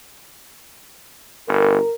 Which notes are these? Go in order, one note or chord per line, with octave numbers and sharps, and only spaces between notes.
G1 A#4